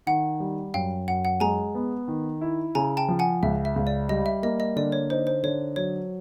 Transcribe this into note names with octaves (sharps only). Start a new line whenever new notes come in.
D#3 F#5
G3
F#2 F5 G5
F#2 F#5
F#5
G#3 G#5 A#5
B3
D#3
E4
C#3 G#5 A#5
G5 A5
F3
F#5 G#5
C#2 E5
E5
C#2
D5
G3 D#5
E5
A#3 D#5
D#5
D3 D5
C#5
D#4 C5
C5
D3 C#5
F#3 C#5